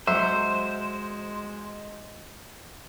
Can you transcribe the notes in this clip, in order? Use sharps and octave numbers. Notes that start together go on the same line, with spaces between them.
F#3 G#3 C5 E5